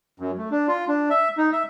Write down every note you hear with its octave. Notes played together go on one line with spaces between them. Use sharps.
F#2
A3
D4
F4
D4
E5
D#4
E5